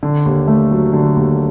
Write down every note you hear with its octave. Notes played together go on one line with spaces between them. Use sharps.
D3
D#2
A3
F#3
D3
D#2